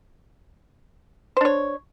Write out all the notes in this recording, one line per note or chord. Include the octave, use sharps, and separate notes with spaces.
D4 C5 C#5